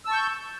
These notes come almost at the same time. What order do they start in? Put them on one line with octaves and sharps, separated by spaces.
E6 A5 C#6 G6